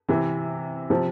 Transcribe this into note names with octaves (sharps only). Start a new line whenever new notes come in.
C3 E3
C3 F3